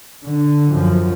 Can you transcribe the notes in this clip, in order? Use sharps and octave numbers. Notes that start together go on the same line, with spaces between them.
D3
F#2 F3